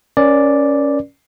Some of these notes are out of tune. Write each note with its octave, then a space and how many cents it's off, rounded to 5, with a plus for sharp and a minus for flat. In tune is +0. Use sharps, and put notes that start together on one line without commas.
C#4 +5 A#4 +40 D5 +0